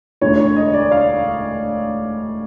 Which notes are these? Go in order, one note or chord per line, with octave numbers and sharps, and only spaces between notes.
E1 D2 D3 C#5
D#5
D5
F5